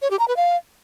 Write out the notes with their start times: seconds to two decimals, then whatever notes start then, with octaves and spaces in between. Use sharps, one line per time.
0.02 C#5
0.11 G4
0.19 A#5
0.28 B4
0.37 F5